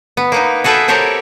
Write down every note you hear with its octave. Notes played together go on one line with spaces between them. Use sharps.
B3
A#3 B3 D#4
F#4 G#4 A4 B4 E5 G5
C4 F#4 G4 A4 A#4 C#5